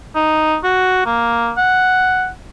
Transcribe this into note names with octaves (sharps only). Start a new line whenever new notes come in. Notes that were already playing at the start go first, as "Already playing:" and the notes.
D#4
F#4
A#3
F#5